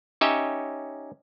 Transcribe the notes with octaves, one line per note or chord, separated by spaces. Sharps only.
C#4 D#4 G4 C#5 D#5 E5